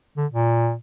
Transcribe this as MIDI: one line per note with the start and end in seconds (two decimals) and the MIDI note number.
0.17 0.26 50
0.32 0.74 46